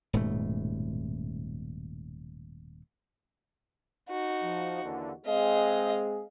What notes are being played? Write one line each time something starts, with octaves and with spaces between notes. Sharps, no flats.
D#1 G#2 B2 A3
D#4 F#4
F3
D#2 D3 E3
G#3 C4 G#4 D#5 F5